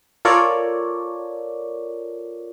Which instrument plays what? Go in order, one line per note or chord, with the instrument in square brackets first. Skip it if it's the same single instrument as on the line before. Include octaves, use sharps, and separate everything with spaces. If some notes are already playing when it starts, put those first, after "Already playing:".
[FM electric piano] F4 A4 A#4 C#5 D5